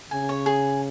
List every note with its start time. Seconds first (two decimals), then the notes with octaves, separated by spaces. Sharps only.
0.11 C#3 G#5
0.29 C#5
0.46 G#4